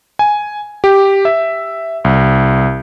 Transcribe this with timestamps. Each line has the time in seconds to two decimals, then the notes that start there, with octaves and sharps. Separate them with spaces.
0.19 G#5
0.84 G4
1.25 E5
2.04 C2